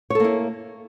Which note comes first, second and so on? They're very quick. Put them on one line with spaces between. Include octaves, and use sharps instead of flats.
C#5 A4 A#3 E4